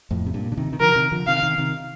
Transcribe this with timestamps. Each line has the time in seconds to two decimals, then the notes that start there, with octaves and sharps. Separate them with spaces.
0.11 F2 A2
0.27 C3
0.34 G2 A#2
0.52 D3
0.57 C3 D#3
0.72 D#3
0.80 D3 F3 A#4
0.96 C3 D#3
1.12 D3 F3
1.27 C3 D#3 F5
1.43 C3 D#3
1.58 C3 D#3